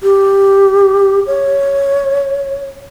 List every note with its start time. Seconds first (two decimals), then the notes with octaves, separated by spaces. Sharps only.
0.03 G4
1.27 C#5